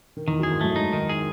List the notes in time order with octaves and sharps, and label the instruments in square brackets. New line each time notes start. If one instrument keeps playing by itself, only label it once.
[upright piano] D#3
[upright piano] E2 E3 [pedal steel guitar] D#3
[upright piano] F#2 F#3 [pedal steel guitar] G#4
[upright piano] G#2 G#3
[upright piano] F#2 F#3 [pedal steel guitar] A3
[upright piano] G#2 G#3 [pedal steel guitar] D#4
[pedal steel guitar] D#3
G#4